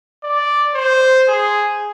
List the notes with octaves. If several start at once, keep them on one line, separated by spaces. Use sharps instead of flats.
D5
C5
G#4